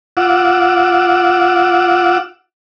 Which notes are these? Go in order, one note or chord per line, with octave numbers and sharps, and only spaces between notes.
F4 F#5 D6 E6